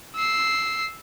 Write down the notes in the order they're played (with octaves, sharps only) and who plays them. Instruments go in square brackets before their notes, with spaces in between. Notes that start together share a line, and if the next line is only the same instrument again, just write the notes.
[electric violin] E6 C7